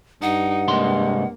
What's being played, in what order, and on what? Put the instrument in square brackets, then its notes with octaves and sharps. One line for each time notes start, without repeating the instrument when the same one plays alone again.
[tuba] G2 [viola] D#4 [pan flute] F#5
[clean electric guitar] C3 G#3 C6 [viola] A#3